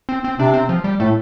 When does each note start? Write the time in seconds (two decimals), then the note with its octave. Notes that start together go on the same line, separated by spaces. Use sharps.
0.09 C4
0.24 C4
0.39 C3 D4
0.54 C4
0.69 F3
0.84 G3
1.00 A2 A3